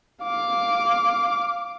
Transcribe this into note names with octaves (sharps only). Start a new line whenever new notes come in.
F5 D6